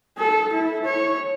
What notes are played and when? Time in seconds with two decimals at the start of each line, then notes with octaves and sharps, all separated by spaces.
0.18 A4
0.53 E4
0.85 C#5